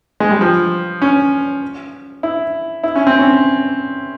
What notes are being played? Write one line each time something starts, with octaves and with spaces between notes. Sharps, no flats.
G#3
G3
F3
C#4
E4
E4
C#4
C4
C#4